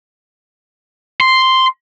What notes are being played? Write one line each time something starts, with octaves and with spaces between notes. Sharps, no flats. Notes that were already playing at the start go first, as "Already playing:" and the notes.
C6